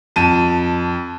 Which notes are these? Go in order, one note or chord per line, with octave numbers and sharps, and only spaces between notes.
F2 A5 D#7